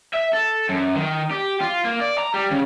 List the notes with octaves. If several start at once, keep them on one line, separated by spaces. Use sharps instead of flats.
E5
A4
F#2
D#3
G4
F4
A#3
D5
A#5
G3
C#3